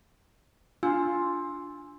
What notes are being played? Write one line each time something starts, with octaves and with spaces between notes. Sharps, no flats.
D4 F4 G#5 E6